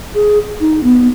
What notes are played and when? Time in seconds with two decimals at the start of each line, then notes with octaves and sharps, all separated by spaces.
0.15 G#4
0.61 D#4
0.83 B3